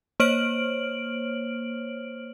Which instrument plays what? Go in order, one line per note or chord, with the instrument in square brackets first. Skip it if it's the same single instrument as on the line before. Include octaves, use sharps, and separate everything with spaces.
[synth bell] A#3 C5 C#5 F6 D7 F#7